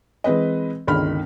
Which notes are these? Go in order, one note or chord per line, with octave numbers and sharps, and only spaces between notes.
E3 G#3 C4 B4 D#5
G1 C#2 D#3 B5 F6